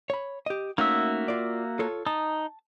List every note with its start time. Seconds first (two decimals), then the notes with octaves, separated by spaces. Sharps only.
0.10 C#5 B5
0.46 G4 D#5
0.78 A3 A#3 C#4 D#4 F#4 E5
1.28 F4 D5
1.79 F4 A4 C#5
2.07 D#4 A5